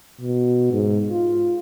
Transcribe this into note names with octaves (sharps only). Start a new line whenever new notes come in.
B2
G#2
F4